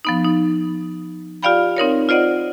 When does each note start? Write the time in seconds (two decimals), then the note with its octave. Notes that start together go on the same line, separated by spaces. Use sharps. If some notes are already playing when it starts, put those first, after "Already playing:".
0.05 F3 B3 D#4
0.25 D#4
1.43 F4 G4 D5 F5 G5 B5
1.77 C4 D#4 A#4 C#5
2.09 F4 C5 D5 D#5 F#5